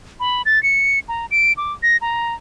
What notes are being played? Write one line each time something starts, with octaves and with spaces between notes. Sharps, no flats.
B5
A6
C#7
A#5
D7
D6
A#6
A#5